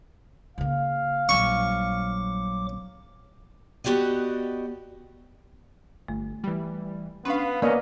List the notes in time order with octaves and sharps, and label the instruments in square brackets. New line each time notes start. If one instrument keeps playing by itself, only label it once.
[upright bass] C#3 A#3 [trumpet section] F5
[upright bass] A#1 G3 [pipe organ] F#3 D6 [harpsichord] C#6
[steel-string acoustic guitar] B3 F#4 G4 D5 D#5
[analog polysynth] G1 [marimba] A3
[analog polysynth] E3 G3
[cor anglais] B3 [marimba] C#4 D4 [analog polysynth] B4 F5
[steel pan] A#3 B3 D#5 [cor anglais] C#4 [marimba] D5